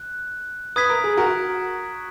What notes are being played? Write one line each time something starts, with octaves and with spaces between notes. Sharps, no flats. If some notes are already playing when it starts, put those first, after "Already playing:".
Already playing: F#6
B4 D#6 G#6 B6
A#4
G#4
F#4 A#4